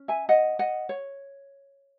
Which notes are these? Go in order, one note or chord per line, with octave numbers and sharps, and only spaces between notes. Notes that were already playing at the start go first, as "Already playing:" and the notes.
Already playing: C#4
E5 G#5
D#5 F#5
D#5 F#5
C#5